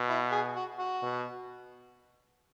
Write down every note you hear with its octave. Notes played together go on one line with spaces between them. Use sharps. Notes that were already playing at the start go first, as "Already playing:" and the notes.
Already playing: B2
E4
G#4
F#4
F#4
B2